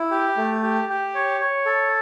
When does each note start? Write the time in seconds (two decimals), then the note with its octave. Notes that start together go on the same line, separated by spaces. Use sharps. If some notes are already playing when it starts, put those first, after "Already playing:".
Already playing: E4
0.11 G4
0.37 A3
0.63 G4
0.89 G4
1.15 C#5
1.40 C#5
1.66 A4